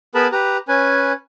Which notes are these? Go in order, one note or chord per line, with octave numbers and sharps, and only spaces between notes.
B3 G#4 A#4 B4 A5 B5
G4 B4 A#5
C#4 B4 G#5